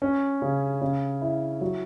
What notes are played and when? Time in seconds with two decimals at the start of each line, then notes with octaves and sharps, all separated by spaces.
0.02 C#4
0.42 C#3
0.81 C#3
1.22 E4
1.61 F#3